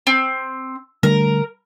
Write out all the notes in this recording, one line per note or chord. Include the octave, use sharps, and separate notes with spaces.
C4
D3 G3 A3 A#4